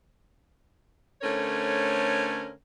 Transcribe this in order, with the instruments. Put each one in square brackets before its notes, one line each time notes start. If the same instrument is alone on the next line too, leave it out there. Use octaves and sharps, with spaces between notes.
[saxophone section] D3 A3 C#4 A#4 C5 C#5